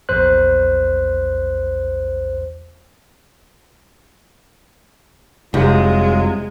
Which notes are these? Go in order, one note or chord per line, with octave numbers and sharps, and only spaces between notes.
A#1 E2 C5 F#6
F1 C2 F#3 G#3 F4